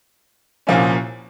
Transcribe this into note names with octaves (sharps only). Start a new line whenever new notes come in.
C2 A#2 F3 A#3 C#4